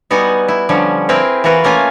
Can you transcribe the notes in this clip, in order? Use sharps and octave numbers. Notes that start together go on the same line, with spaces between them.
G3 B3 D#4 F#4 G#5
E4
D3 F3 G3 C#4
C4 E4 G#4 A#4 B4 G5
E3 F4 F#4 A#4 B4
A3 A#3 C#4 F4 G#5